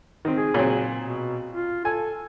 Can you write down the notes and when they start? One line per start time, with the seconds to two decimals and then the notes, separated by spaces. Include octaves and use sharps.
0.25 D#3 C4
0.38 G#4
0.54 A#2 F#3 C4
1.01 B2
1.53 F4
1.85 A4 G#5